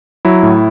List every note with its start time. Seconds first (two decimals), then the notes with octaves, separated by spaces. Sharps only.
0.25 F#3 E4
0.43 A2